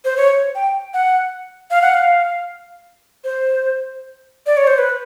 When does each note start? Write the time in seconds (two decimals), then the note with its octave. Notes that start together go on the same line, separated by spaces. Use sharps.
0.05 C5
0.17 C#5
0.55 G5
0.94 F#5
1.71 F5
1.82 F#5
1.94 F5
3.24 C5
4.46 D5
4.57 C#5
4.67 C5
4.78 B4